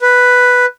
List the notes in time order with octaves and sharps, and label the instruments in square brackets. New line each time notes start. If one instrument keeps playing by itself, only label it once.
[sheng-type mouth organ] B4